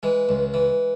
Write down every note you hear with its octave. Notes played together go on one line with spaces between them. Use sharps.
E3 G#3
C#2
E3